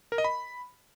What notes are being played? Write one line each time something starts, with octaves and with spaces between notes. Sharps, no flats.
A#4
D#5
B5